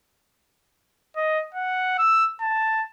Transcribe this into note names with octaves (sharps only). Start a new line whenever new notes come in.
D#5
F#5
E6
A5